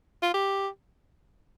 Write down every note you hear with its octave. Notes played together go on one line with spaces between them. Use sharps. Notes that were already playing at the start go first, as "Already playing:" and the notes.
F4
G4